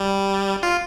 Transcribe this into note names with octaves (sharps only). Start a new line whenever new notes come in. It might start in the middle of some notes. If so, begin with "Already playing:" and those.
Already playing: G3
F4